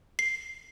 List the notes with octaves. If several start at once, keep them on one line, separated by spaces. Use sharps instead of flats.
C7